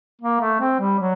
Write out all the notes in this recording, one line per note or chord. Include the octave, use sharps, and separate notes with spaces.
A#3
A3
C4
G3
F#3